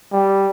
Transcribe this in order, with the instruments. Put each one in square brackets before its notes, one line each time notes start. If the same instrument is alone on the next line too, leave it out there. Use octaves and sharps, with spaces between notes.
[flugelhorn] G3